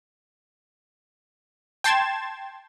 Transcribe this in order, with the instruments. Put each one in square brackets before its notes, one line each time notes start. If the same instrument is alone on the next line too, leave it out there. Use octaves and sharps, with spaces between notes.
[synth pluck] G5 A5 C6 G#6 A6 E7